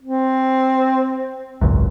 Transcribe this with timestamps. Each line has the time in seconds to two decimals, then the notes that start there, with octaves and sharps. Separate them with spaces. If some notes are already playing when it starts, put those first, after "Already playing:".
0.03 C4
1.61 G#1 C#2 F#2